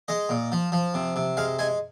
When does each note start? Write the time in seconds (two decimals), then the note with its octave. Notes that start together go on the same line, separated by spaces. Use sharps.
0.08 G#3 D#5
0.29 A#2
0.52 F3
0.72 F3
0.94 C3
1.16 C3
1.37 G#3 F5
1.59 G#3 G#5